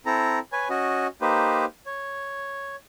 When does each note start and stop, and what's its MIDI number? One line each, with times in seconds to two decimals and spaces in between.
0.06 0.39 60
0.06 0.39 64
0.06 0.39 69
0.06 0.39 82
0.53 0.68 71
0.53 0.68 73
0.53 0.68 80
0.70 1.07 61
0.70 1.07 66
0.70 1.07 75
1.21 1.65 58
1.21 1.65 63
1.21 1.65 67
1.21 1.65 71
1.21 1.65 72
1.86 2.76 73